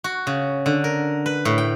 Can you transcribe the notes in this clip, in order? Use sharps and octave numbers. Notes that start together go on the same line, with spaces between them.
F#4
C#3
D3
A#4
B4
A2
G5